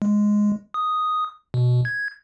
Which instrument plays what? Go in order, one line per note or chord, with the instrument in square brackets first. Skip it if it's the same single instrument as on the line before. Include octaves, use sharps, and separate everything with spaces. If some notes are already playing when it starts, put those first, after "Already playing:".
[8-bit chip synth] G#3
D#6
B2
G#6